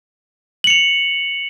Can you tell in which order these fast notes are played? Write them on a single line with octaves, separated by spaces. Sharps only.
F#7 C#7 F7